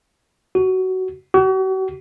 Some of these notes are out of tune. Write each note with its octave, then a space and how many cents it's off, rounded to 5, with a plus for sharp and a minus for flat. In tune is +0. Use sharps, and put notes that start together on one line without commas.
F#4 +15
F#4 +40